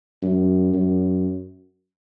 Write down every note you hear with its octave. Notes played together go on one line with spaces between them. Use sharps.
F#2
F#2